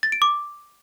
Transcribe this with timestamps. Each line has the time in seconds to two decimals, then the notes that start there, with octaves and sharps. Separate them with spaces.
0.03 A6
0.12 D7
0.22 D6